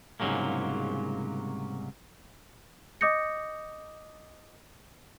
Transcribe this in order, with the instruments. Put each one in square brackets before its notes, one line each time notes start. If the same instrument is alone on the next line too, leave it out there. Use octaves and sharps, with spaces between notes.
[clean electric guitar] C2 G#2 C#3 F#3 G#3 A#3
[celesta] D#5 D6 D#6 G6 A#6 C#7